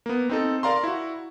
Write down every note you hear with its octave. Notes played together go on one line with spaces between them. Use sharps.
A#3 B3
C4 D#4 A4
A#4 D5 F5 A#5 C6
E4 F#4